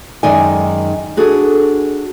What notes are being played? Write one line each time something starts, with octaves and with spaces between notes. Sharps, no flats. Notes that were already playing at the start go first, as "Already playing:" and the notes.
F#2 D#3 G#3 D#4 D5 G#5
D4 F#4 G#4 A4